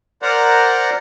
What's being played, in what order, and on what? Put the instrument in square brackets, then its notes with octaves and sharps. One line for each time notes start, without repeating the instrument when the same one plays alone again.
[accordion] A#4 C5 D5 F#5 A#5